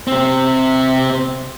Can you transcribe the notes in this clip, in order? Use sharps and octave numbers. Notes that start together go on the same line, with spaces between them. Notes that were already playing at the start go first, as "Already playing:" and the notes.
C3 C4